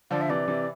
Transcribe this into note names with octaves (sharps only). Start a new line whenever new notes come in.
D3 F3 D5
E5
C3 E3 D5
C3 E3